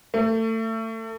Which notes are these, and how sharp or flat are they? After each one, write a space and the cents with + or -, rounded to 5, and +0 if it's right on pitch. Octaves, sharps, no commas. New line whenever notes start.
A3 +30